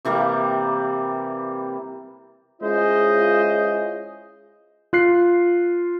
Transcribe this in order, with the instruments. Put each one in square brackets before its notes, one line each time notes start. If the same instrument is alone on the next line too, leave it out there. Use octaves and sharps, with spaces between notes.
[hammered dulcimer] C3 E3 G3 A#3
[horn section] G#3 C#4 E4 F4 C5 D#5
[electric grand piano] F4 F#6 C7